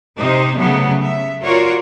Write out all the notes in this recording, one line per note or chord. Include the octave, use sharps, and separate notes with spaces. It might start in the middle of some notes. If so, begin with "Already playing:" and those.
C3 D#4 C5
C#3 F#3 A3 B3
E5
F4 F#4 A#4 C#5 D5